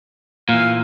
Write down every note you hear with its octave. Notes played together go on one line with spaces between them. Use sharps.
A#2 E3 F5